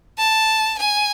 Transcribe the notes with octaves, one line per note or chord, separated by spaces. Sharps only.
A5
G#5